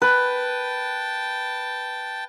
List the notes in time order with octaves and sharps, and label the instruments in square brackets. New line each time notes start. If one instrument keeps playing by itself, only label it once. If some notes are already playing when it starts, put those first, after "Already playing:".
[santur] B4 [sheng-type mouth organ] G5 A5